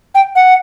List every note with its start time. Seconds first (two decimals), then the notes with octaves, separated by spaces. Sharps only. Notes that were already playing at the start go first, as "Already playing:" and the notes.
0.15 G5
0.35 F#5